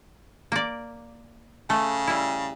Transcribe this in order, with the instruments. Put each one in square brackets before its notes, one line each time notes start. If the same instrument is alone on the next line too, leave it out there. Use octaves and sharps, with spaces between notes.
[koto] A#3 D5
[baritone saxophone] C#3 [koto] A3
[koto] G3 E4